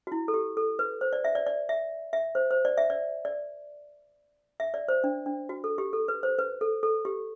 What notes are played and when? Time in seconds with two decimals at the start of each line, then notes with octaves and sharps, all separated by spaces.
0.07 F#4
0.12 E4
0.28 A4
0.34 G4
0.57 A4
0.79 B4
1.01 C5
1.13 D5
1.24 E5
1.35 D5
1.46 D5
1.69 E5
2.13 E5
2.35 C5
2.51 C5
2.65 D5
2.77 E5
2.90 D5
3.25 D5
4.60 E5
4.74 D5
4.88 C5
5.04 D4
5.26 D4
5.49 F#4
5.64 A4
5.78 G4
5.93 A4
6.08 B4
6.23 C5
6.38 B4
6.61 A4
6.83 A4
7.05 G4